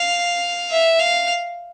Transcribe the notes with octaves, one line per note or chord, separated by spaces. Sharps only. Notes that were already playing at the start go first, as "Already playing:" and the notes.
Already playing: F5
E5
F5